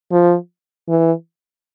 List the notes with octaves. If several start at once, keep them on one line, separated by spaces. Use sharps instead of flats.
F3
E3